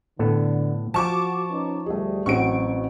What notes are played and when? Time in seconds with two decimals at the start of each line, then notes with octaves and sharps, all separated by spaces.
0.19 A2 D3 B3 A4
0.94 F3 F#4 A5 C#6 D6
1.49 C#4 D#4 B4
1.86 D2 G3 A3 G#4 D#5
2.26 A1 F#3 C4 F#4 F#5 C#6 D7